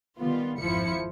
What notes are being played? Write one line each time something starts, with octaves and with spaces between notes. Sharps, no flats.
D#3 G3 B3 F4
G#1 F2 F3 E4 C#7